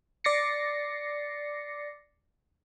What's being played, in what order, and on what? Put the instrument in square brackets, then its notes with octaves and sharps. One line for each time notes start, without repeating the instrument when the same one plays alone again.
[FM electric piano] D5 D6 A6 A#6 C7 C#7